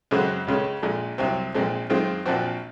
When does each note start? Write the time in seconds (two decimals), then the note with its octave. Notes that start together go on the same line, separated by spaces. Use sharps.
0.11 F#2 C#3 G#3 C4 F#4
0.47 C#2 C#3 G#3 C#4
0.83 A#1 A#2 G#3
1.18 C2 C3 F#3 C4
1.54 A#1 A#2 G#3 C4
1.90 F#2 D#3 G#3 C4 F4
2.26 A#1 A#2 F3 C4 F#4